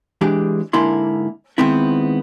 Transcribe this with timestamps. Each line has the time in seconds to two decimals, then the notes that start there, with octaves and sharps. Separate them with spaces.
0.21 E3 G#3 D4 G4
0.73 G#2 D3 A#3 E4 C6
1.58 D#3 G#3 B3 C4 E4